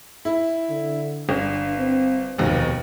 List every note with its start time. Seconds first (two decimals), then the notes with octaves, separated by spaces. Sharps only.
0.25 E4
0.70 D3
1.29 G1 D4
1.79 C4
2.38 F1 D#2 B2